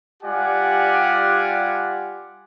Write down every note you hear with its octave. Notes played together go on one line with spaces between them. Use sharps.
G3 F4 G4 D5 F#5 G#5